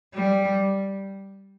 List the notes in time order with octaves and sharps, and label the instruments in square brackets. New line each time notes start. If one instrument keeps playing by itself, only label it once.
[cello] G3